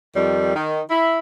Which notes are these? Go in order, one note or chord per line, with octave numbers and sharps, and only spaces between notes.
F2 D#3 G3
D#3
E4